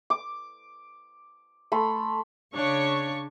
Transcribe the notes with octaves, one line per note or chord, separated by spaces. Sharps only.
D6
A3 B5 C6
C#3 D4 C#5 C#6